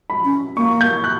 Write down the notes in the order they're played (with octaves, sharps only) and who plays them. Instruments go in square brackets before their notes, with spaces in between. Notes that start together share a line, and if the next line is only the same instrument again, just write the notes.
[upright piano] B5
[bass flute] C#4
[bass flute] A#3 [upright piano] C#6
[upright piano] G6
F#6